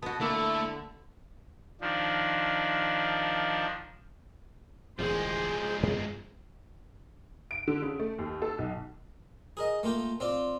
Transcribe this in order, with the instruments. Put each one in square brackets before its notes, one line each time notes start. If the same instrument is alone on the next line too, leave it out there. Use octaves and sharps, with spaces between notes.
[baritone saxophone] B2 [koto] B3 F#4 [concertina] A5 D#6
[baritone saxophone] D3 [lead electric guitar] A3 [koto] A#3 [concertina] E4 A4
[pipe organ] D#3 F3 D4
[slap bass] E1 A1 D2 [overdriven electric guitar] F3 G#3 [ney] G#4 [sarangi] C5
[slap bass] D2 G2 B3
[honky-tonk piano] D7
D3
C#3
A3
D#2
A4
B1
[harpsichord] G#4 A#4 D#5
A3 A#3 F4 G5
C4 F4 D5